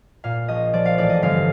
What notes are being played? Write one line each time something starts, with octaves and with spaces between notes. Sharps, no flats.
A#2 F5
A#1 D#5
F3 D5
F5
A1 D5
D#5
G1 F5